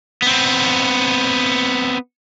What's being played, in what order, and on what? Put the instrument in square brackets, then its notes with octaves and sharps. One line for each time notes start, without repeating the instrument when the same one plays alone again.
[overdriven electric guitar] B3 C4